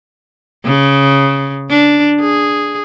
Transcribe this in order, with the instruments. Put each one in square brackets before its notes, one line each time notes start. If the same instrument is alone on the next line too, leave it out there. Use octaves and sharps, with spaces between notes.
[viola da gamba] C#3
D4
G#4